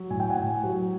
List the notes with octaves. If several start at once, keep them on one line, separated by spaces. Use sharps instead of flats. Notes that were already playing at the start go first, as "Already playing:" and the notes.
Already playing: F#3
A2 G#5
G5
F#5 G#5
A2
F#3